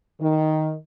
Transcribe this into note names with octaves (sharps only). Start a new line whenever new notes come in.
D#3